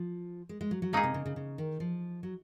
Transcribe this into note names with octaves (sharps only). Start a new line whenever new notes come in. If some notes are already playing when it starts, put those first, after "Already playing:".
Already playing: F3
G#3
G#3
F#3
F#3
G#3 A#3 D#4 G#4
C3
C#3
C#3
C#3
D#3
F3
F#3